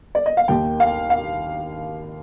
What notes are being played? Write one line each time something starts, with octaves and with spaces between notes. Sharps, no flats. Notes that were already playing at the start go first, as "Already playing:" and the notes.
D5
D#5
F5
D#2 D#3 A#3 G5
F5
F5